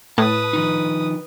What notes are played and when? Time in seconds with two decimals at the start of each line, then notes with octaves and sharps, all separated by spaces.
0.18 A2 B4 A5 D#6
0.53 D#3 F3 D#4